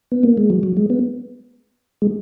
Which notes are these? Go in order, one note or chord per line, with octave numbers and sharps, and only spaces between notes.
B3
A#3
G#3
F#3
F#3
G#3
B3
G#3